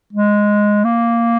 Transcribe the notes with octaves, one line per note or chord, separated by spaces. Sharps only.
G#3
A#3